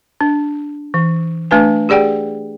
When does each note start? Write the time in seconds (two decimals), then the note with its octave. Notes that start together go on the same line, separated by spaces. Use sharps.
0.21 D4
0.94 E3
1.51 A3 D4 B4 G#5
1.89 G4 G#4 D5 F#5 G5